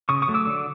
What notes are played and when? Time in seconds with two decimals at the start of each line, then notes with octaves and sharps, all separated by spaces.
0.09 C#3 C#6 D#6
0.22 C#6 D#6
0.28 F#3 A3
0.34 D6 E6
0.47 D3